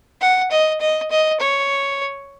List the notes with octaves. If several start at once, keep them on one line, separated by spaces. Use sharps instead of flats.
F#5
D#5
D#5
D#5
C#5